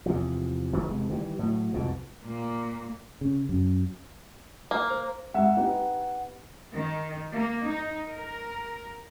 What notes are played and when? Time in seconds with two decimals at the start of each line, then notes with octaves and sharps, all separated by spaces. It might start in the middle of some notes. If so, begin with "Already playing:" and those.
0.06 E2 C3 F3
0.73 G1 D#3 F#3 B3
0.86 E1 C3 G#3
1.10 D#3 E3 F#3 G3
1.39 A2 F#3
1.73 C2 F2 G#2 B2
2.25 A#2 A#3
3.21 C#3
3.49 F#2
4.71 A#3
4.90 C5
5.34 G#2 E5 F#5
5.57 B3 D#4 G4
6.72 D#3
7.32 A#3
7.67 D#4
8.09 A#4